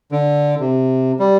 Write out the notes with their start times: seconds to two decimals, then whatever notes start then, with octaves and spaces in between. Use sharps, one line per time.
0.12 D3
0.60 C3
1.20 G3